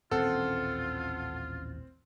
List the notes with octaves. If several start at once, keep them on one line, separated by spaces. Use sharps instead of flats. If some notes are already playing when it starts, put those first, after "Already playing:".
D#1 A1 C4 C#4 F4 A4 F#5